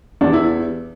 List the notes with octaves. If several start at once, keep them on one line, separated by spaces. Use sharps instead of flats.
E2 C3 E3 D4
E4